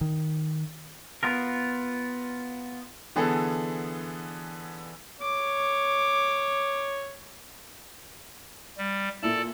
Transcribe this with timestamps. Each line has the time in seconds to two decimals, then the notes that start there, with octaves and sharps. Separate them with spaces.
0.01 D#3
1.23 B3 F4 A#4
3.16 D3 E3 B3 G#4 A4
5.22 C#5 D6
8.78 G3
9.23 A#2 E4 A4 D5 A5